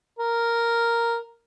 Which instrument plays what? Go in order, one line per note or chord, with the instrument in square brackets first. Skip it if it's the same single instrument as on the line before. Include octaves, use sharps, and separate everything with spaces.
[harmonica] A#4